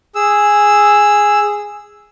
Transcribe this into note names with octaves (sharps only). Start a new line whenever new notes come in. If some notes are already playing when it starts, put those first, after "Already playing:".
G#4 E6